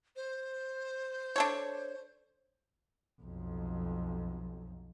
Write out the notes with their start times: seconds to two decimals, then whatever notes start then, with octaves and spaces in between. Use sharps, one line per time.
0.16 C5
1.36 D4 A4 C#5
3.21 B1 F2